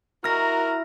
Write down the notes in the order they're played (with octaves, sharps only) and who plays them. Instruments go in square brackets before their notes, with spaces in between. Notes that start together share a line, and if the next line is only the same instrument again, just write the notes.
[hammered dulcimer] E4 [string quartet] F#4 A#5 [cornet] A#4 [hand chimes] F6 A#6